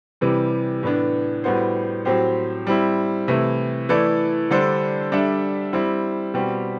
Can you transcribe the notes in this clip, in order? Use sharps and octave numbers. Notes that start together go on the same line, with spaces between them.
C3 E3 G3
A2 E3 B3 D4
A2 G3 B3 F#4 C5
A2 F#3 C4 G4 C5
G3 C4 E4
C3 E3 A3 E4
E3 A3 E4 A4 D5
D3 G3 D4 A4 C5
G3 D4 A4 E5
G3 C4 E4
B2 G3 C4 G4